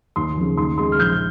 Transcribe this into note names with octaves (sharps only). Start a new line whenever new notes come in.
D#2 C6
C#3 F3
D#2 C6
C#3 G#3 C6
F6
A#1 G6